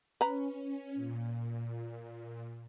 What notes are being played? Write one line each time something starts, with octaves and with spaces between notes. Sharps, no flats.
C#4 B4 A#5
A#2